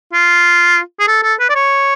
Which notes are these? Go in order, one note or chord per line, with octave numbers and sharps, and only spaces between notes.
F4
G#4
A4
A4
B4
D5
C#5